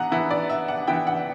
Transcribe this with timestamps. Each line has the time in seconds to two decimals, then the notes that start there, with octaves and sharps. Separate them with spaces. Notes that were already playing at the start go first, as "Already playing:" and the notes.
Already playing: E3 B3 F#5 A#5
0.12 E3 B3 E4
0.31 D5
0.49 E5
0.68 F#5
0.87 E3 B3 E4 G5
1.07 F#5